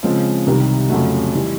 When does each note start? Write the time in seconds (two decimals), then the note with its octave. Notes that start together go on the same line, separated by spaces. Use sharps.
0.03 C#3 F3 G#3 C4
0.46 C2 C3 D#3 G3
0.90 F2 C#3 F#3 A3
1.34 E3 G3